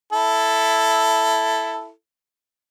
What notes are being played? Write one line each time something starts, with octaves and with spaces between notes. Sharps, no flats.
E4 A4